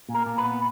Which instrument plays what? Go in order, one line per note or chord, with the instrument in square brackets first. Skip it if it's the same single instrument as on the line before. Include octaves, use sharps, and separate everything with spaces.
[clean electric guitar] A#2
A#4
A#2
B4
B3